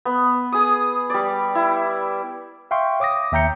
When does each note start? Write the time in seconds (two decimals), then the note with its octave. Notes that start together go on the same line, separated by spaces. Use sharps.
0.05 B3
0.52 G#4 D#6
1.10 G3 D5
1.55 E4
2.71 E5 F5 G5 C6 C#6
3.00 C#5 D6 D#6 A#6
3.32 D#2 E5 G5 A#5 G6 C#7